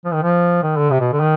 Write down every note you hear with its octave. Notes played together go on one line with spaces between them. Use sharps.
F3
D#3
F3
D#3
D3
C3
B2
D3
D#3